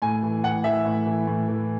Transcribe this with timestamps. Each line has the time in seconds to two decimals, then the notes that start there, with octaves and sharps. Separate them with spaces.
0.02 A2 G#5
0.22 E3
0.43 A2 F#5
0.64 E3 E5
0.85 A2
1.06 E3
1.27 A2
1.48 E3